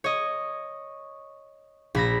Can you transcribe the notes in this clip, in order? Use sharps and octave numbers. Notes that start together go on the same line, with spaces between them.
C#5 D#5
A#1 B5 A#6